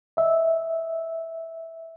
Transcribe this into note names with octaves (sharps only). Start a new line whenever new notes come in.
D#5 E5